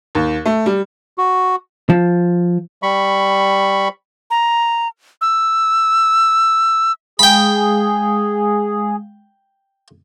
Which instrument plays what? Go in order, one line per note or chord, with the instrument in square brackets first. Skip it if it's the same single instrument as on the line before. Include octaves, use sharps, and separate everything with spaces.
[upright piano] D#2
A3
G3
[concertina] F#4
[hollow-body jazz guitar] F3
[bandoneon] G3 B5 C#6
[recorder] A#5
E6
[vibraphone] G#3 F5 [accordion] G#4 [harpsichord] G5 B5